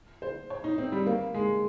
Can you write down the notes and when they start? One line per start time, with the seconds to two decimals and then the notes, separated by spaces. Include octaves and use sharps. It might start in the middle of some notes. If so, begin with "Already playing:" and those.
0.22 C5
0.50 C#5
0.64 D#4
0.78 C4
0.92 G3
1.07 A#3
1.35 G#3